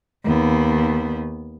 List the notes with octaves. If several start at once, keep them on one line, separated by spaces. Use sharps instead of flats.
D#2 B3